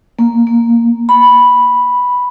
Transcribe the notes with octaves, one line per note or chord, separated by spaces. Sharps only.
A#3
A#3
B5